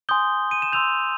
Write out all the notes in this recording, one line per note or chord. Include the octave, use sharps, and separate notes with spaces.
G#5 C6 D#6 G6 G7
D#7
E7
C6 E6 G6 F7